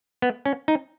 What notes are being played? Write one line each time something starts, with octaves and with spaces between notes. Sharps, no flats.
B3
C#4
D#4